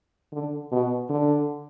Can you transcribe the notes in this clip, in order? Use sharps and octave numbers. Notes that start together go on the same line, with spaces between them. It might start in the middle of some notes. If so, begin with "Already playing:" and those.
D3
B2
D3